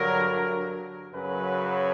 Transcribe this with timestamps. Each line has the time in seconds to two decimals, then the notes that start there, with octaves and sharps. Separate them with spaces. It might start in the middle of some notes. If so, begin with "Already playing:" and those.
Already playing: G2 D3 F#3 A#4
1.14 F#2 C#3 F#3 B4